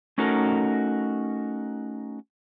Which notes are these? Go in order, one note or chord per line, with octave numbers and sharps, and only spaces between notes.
A3 C#4 D#4 F#4 A4 A#4